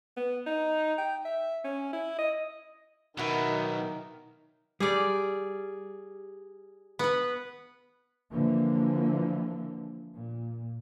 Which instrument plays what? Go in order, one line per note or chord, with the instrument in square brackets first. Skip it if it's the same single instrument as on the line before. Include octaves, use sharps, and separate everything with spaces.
[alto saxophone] B3
D#4
G5
E5
C#4
E4
D#5
[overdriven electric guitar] B1 B2 [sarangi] D#3 [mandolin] E4 F#4
[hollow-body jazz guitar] G3 [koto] G#4 D5
[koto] B3 B4
[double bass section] D3 E3 F3 A#3
A#2